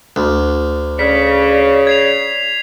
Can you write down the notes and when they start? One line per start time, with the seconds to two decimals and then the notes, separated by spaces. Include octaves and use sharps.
0.16 D2
0.99 C#3 D5 B6
1.87 G#6 C7 F7